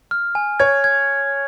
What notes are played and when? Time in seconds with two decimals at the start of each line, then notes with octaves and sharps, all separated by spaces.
0.11 F6
0.35 G#5
0.60 C#5 G#6
0.84 G#6